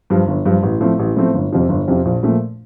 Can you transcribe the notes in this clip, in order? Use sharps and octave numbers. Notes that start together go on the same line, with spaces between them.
G2 F3
G1
G2 F3
A1
A2 F3 A3 C4
A1
A2 F3 A3 C4
G1
F2 C3 F3
G1
F2 C3 F3
A#1
A#2 F3 A3